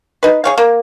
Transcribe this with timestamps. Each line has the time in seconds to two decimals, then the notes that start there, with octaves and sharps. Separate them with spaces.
0.23 D#4 B4
0.44 G#4 C#5 F5
0.58 A#3